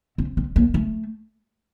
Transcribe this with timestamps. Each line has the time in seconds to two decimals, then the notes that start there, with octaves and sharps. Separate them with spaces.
0.18 C4
0.37 C4
0.56 A#3
0.74 A3